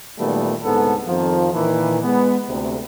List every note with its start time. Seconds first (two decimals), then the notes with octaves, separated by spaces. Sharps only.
0.19 A#2 D#3 F#3 G3 A3 B3
0.63 C2 G#2 D3 B3 A4
1.07 F2 D#3 F3
1.53 A#2 D#3 E3
2.02 G#3 B3
2.48 D2 C3